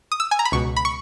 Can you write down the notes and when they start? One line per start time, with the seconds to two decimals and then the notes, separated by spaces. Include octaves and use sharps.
0.12 D#6
0.20 E6
0.31 G#5
0.39 A#5
0.45 B5
0.52 C#2 B2 C#6
0.76 B5
0.85 C#6